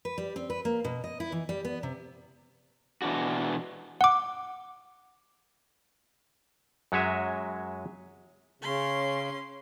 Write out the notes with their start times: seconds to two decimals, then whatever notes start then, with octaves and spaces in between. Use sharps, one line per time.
0.05 B4
0.18 G3
0.36 C4
0.50 B4
0.65 A#3
0.85 B2
1.04 D#5
1.20 E4
1.32 E3
1.49 G3
1.65 B3
1.83 C3
3.02 B2 E3 D4 F#4
4.01 F#5 D6
6.92 F#2 F#3 G#3 C#5 E5 G#5
8.62 C#3 C#4 C6